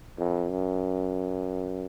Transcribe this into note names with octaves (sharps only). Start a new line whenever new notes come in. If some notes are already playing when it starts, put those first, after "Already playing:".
F2
F#2